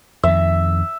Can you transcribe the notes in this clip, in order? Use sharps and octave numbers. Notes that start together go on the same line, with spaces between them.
F2 D#3 E5